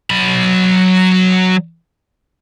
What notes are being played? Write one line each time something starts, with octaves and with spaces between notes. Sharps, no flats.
F#3 B5